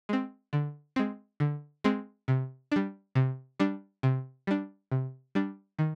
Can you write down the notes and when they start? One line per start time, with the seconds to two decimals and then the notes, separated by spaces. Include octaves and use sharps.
0.09 G#3 C4
0.53 D3
0.96 G#3 C4
1.40 D3
1.84 G#3 C4
2.28 C3
2.72 G3 D4
3.15 C3
3.59 G3 D4
4.03 C3
4.47 G3 D4
4.91 C3
5.35 G3 D4
5.79 D#3